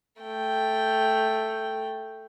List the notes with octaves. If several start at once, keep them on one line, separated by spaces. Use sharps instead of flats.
A3 G5